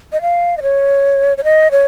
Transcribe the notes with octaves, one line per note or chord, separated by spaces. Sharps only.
D#5
F5
D#5
C#5
C#5
D#5
C#5